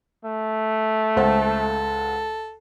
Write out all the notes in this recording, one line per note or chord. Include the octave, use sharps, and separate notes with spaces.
A3
C#2 A4 C5 F#5